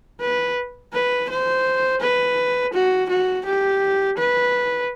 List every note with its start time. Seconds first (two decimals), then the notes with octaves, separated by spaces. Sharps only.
0.20 B4
0.93 B4
1.29 C5
2.01 B4
2.74 F#4
3.10 F#4
3.45 G4
4.17 B4